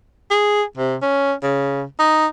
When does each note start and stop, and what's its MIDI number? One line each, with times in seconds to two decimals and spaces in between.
0.31 0.63 68
0.78 0.95 48
1.02 1.32 61
1.43 1.83 49
1.99 2.26 63